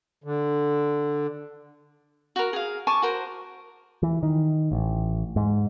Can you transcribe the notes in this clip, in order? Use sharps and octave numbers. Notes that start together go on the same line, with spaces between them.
D3
F#4 A#4
G#4 F5
G#5 A5 C#6 D6
F#4 A#4 C5
E3
D#3
A1
G#2